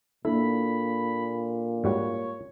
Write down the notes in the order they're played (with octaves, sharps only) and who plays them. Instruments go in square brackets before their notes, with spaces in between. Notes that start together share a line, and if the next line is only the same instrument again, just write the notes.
[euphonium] A#2 [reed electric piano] A#3 D4 A4 [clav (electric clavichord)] E4 [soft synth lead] B5
[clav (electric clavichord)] G#2 G3 F#4 [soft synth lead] C#5